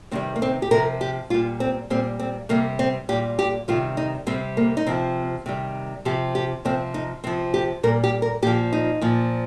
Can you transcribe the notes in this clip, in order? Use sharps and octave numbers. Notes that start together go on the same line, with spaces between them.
C3 D#3 G3 C4
A#3
C4
G4
C3 F3 A#4
G4
A#2 G3 F4
C4
A#2 G3 C4
C4
C3 G3 A#3
C4
A#2 G3 G4
G4
C3 D#3 G3 F4
D#4
C3 G3 C4
A#3
D#4
C3 F3 C4
C3 D#3 G3
C3 F3 G4
G4
C3 F3 C4
D#4
C3 F3 C4
G4
A#2 G3 A#4
G4
A#4
A#2 F3 G4
D#4
A#2 F3